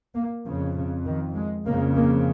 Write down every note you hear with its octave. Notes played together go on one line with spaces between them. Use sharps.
A#3
F2 C#3 F3
C#3
D#3
G#3
F2 C#3 A#3
A#3